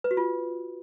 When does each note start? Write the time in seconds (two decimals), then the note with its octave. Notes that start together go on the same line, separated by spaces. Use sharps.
0.04 B4
0.11 F#4
0.17 F4